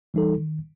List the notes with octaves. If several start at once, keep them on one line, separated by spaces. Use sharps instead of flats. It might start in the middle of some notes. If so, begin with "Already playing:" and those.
E3 G3 D#4 A4
D#3